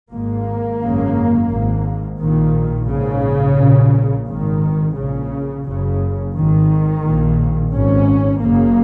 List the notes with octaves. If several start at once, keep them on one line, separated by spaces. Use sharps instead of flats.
G#1 G#2 A#3
G#1 F#2 C#3
G#1 G#2
A#1 A#2 D#3
A#1 G#2 C#3
A#1 A#2
G#1 G#2 D#3
A#1 A#2 C#3
F#1 F#2 C#3
G#1 G#2 D#3
A#1 A#2
G#1 G#2 C#4
F#1 F#2 C#3 A#3